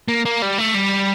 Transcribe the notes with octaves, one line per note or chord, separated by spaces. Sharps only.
A#3
A#3
G3
A3
G3